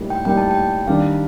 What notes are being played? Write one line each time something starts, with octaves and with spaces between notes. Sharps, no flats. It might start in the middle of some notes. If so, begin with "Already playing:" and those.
Already playing: A2 G3 A#3 D#4
G5
A2 G3 A#3 D#4 G5
A5
G5
D#3 G3 D4 F5